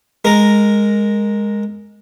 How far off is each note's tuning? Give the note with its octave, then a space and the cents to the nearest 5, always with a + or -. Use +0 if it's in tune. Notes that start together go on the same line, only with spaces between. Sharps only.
G#3 +0 A#4 +0